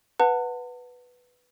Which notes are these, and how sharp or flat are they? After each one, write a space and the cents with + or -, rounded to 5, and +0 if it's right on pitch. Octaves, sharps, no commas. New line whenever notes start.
B4 +0 F#5 -15 A5 +40